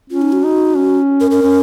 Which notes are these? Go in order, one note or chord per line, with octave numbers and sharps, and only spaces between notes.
C#4 F4
D#4
F#4
D#4
C#4
A#4
A#4
C#4